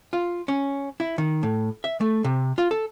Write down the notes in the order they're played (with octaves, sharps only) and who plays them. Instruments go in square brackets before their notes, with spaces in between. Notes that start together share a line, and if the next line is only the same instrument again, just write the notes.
[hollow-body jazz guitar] F4
C#4
E4
D#3
A2
E5
A3
C3
F4
A4